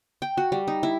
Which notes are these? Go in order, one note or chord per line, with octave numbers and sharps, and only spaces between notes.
G5
F#4
G3
D#4
E4